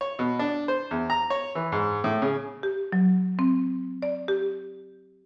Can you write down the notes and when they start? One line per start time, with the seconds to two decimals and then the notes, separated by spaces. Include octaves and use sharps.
0.01 C#5
0.19 B2
0.39 D4
0.68 C5
0.91 E2
1.10 A#5
1.30 C#5
1.55 E3
1.72 G#2
2.04 A2
2.22 C#3
2.63 G4
2.92 F#3
3.39 C4
4.02 D5
4.28 G4